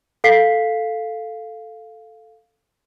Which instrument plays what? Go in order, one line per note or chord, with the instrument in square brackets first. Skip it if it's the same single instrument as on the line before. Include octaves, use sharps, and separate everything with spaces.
[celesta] A4 F5 B6 C7